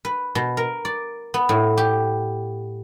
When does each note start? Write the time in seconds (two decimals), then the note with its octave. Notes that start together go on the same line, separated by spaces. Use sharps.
0.05 B4
0.35 B2
0.57 A#4
0.85 D5
1.34 B3
1.49 A2
1.78 G4